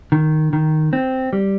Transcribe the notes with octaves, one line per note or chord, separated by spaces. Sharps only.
D#3
D#3
C4
G3